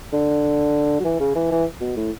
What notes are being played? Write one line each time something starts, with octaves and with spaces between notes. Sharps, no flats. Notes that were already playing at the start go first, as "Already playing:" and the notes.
D3
F#3
E3
C#3
E3
E3
B2
A2